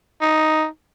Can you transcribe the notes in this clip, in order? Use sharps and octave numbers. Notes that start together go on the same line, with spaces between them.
D#4